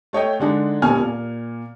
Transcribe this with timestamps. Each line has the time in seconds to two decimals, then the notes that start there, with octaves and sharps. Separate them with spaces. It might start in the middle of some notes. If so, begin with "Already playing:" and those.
0.13 A3 C#5 D#5 G5
0.39 D3 G#3 D4 D#4
0.82 D#1 D#2 C#4 G#5 F6
1.00 A#2